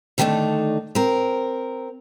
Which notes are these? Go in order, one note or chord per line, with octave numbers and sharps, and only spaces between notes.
D3 D#3 G3 A3 D4 D#4
C4 A#4